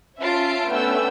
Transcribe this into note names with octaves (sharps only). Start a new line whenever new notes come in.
C#4 F4 E5 A5 C7 D7
A3 B3 C#4 D4 G5 E6